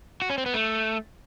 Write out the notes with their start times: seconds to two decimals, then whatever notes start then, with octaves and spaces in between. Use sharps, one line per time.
0.22 F#4
0.30 C#4
0.38 C4
0.46 B3
0.54 A3